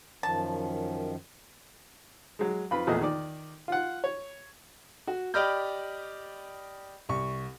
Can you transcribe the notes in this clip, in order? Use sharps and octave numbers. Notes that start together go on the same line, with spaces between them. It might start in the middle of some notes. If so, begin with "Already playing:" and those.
F#2 D#3 F3 A5
F#3 G#3
F2 F4 B4 B5
A#1 E2 A3 G#4 D#5
D#3 D5
F4 F#5
C#5
F#4
G4 D5 D#5 B5 F6 G6
C2 C#6